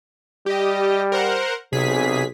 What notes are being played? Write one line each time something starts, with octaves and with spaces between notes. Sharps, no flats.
G3 G4 D#5
A#4 C5 F#5
B1 C3 G#4 B6